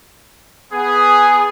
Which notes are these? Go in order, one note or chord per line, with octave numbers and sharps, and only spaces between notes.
B3 G#4